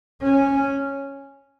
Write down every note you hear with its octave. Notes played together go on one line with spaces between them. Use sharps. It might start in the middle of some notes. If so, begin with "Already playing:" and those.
C#4